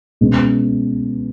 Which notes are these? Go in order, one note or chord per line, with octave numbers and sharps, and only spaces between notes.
B2 G#3 C#4